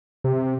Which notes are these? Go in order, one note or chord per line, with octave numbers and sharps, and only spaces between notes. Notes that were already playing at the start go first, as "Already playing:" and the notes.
C3